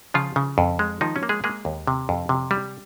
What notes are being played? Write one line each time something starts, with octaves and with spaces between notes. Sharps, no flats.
C#3 F3 F4
C#3
F2
G#3
D#3 F3 D#4
C#4
A#3
G#3 G#4
G#3 A#3 G#4
D#2
C3
F2
C3
G3